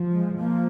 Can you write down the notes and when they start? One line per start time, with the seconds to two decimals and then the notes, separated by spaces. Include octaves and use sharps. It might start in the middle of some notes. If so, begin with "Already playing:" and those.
Already playing: F3
0.11 G#3
0.37 F3 A#3